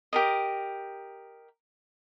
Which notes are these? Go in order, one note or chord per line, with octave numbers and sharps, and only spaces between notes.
G4 A#4 D#5